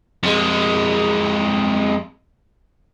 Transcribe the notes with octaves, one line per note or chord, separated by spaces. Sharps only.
F2 G#3